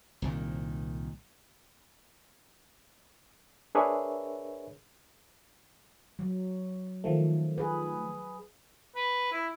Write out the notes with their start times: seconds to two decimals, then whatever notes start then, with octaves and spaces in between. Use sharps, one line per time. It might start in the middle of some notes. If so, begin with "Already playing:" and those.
0.22 C2 A#2 D#3
3.75 D4 G#4 A#4 B4 C#5 E5
6.19 F#3
7.04 D#3 F3 A3
7.58 G#4 B4
8.95 B4
9.32 E4